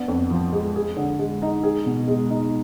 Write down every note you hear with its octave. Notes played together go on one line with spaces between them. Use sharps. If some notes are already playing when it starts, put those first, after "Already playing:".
Already playing: B3 D4
F2
F3
G#3
G#4
D3
G#3
D#4
G#4
B2
G#3
D#4